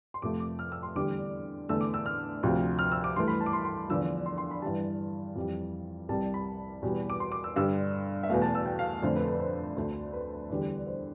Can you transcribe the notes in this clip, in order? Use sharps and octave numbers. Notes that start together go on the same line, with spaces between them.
C6
F2 C3 F3 A3 D6
D6
F6
E6
C6
E2 D3 G3 D6
E2 D3 A3 E6
D6
E6
F6
D2 C3 F3
F6
E6
D6
G2 E3 A3 C6
B5
A5
D6
C6
C6
E2 D3 F3 E6
C6
C6
B5
G2 E3 G3 A5
F2 E3 G3
C2 C3 G3 A5
D5
B5
E2 B2 G3
D6
C6
D6
E6
G2 D3 G3 E6
E5
E2 B2 A3 F5
A5
E6
G5
F5
F2 D3 A3 C5
B4
A4
B4
C5
D2 D3 A3
B4
E2 D3 G3
C5